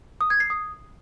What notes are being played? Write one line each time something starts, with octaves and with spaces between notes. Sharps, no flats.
D#6
G#6
C7
D#6